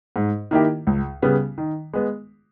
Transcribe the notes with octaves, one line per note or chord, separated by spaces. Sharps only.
G#2
D#3 A#3 E4 G4
C#2
C#3 G3 B3
D#3
G#3 B3